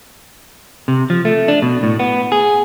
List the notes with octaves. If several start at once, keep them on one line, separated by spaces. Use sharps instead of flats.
C3
F3
A3
D4
B2
A2
B3
G#4